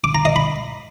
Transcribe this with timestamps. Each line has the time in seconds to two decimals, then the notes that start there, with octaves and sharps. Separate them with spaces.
0.04 D6
0.15 A#5
0.25 D#5
0.36 B5